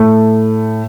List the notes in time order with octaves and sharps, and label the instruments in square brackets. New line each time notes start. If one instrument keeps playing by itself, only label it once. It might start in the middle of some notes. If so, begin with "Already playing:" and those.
Already playing: [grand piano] A2 A3